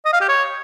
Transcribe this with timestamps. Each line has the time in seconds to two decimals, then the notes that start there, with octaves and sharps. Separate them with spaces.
0.05 D#5
0.13 F5
0.21 G4
0.28 C#5